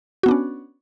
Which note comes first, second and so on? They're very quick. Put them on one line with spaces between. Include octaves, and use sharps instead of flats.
F#4 B3 D4 C#4